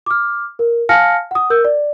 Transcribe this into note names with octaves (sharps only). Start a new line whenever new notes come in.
D6 F6
A#4
F5 G#5 A5 F6 A#6 C#7
F#5 D#6
A#4 E6 G6
D5